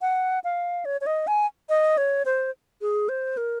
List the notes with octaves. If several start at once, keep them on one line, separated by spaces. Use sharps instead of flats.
F#5
F5
C#5
C#5
D#5
G#5
D#5
C#5
C5
G#4
C5
A#4